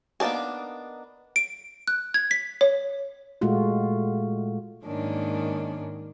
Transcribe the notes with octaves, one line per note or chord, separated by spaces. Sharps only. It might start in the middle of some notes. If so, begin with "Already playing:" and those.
A#3 B3 D4 D#4 G#4
D7
F#6
G#6
B6
C#5
A#2 G#3 A3 F4 F#4
G#2 D#3 A#3 C#4 D4